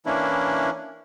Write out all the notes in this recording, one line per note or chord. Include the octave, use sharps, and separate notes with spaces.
E3 A#3 C#4 D4 E4